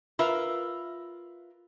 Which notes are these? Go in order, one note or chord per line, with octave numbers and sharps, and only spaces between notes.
F4 A#4 B4 E5